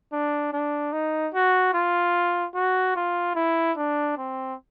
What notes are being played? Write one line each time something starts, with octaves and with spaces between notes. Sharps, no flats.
D4
D4
D#4
F#4
F4
F#4
F4
E4
D4
C4